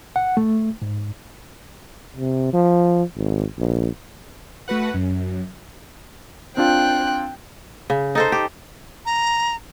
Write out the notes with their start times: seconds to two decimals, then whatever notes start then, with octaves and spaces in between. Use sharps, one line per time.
0.16 F#5
0.37 A3
0.82 G#2
2.16 C3
2.53 F3
3.16 G#1
3.58 A#1
4.68 A3 F#4 B4 F#5
4.94 F#2
6.57 C4 D4 F4 G5 F#6
7.90 C#3
8.15 D#4 A4 C5
8.32 G4
9.06 A#5